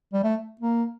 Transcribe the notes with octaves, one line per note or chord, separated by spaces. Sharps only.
G3
A3
A#3